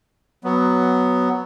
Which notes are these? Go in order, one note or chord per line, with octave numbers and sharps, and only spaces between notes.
F#3 B3